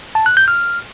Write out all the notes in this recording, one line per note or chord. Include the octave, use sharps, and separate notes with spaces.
A5
F#6
G6
F6